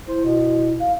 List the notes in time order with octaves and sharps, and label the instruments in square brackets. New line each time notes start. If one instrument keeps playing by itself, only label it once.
[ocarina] E4 [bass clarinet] C5
[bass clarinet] B2
[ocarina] F5